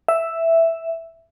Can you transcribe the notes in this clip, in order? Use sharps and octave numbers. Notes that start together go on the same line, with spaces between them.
E5